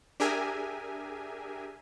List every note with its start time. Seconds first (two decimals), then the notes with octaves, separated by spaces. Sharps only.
0.20 D4 G4 G#4 A#4 E5 G#5